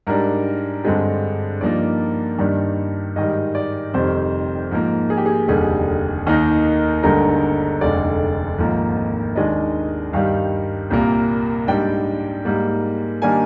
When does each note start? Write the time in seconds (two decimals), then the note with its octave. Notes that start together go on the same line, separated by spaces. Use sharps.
0.07 G#2 G3 D4 A#4
0.84 G2 D3 G#3 C4
1.61 G2 F3 A#3 D#4 D5
2.38 G2 D#3 G3 D4
3.16 G#2 D#3 G3 D#5
3.55 D5
3.93 F1 F2 C3 D#3 G3 C5
4.71 G#2 F3 A#3
5.10 G#4
5.17 G4
5.26 G#4
5.48 F1 D#2 D3 G3 G#4
6.26 D#2 D#3 A#3 D#4
7.03 G1 G2 D3 G#3 D#4 A#4
7.42 A#4
7.81 F1 D#2 D3 G#3 D5
8.58 G#1 G#2 F3 A#3
9.36 D#2 D#3 G#3 D4 D#5
10.13 G2 D#3 G3 F5
10.90 C2 A#2 G3 A#3
11.67 G#2 G3 D4 G5
12.45 G#2 G3 A#3
13.22 D#3 G3 A#3 D4 G#5